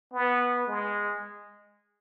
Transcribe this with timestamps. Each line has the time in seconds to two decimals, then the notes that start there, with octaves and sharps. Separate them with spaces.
0.14 B3
0.67 G#3